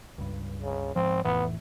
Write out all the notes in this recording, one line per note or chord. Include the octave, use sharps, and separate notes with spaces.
C#2 G2
C#3
G#2 F3 C4
F1 A2 E3 B3